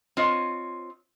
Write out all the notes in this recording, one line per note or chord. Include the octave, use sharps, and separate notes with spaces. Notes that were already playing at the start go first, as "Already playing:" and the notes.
C4 F4 C#5 D#5